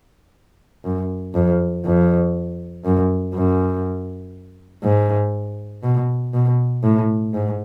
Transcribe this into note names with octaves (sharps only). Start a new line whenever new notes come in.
F#2
F2
F2
F#2
F#2
G#2
B2
B2
A2
G#2